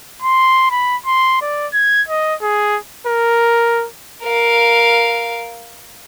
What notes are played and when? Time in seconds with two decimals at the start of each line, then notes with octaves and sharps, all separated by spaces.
0.22 C6
0.71 B5
1.06 C6
1.41 D5
1.73 G#6
2.08 D#5
2.42 G#4
3.06 A#4
4.23 A#4 F5